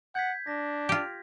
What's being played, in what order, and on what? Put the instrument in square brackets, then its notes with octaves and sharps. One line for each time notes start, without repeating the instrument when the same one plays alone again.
[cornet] F#5 [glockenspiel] G6 G#6 B6
[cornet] D4 [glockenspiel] A#6
[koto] F4 G4